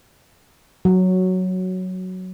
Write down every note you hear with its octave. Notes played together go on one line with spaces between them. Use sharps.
F#3